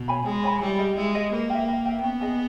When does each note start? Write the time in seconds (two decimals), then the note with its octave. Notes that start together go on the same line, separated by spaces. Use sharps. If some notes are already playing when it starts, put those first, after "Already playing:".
Already playing: B2
0.08 C#5 G#5 B5
0.26 G#3 G#4
0.43 C#5 G#5 B5
0.61 G3 E4
0.79 G#4 D#5
0.96 G#3 E4
1.15 G#4 D#5
1.32 A#3 B4
1.50 E5 G5
1.68 B4
1.86 E5 G5
2.03 B3 C#4
2.21 G#4 D#5 G#5